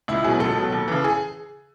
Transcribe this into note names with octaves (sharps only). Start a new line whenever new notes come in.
C#2 E4
B2 F#3 G#4
C#2 A4
B2 F#3
D#2
C#3 E3
G#4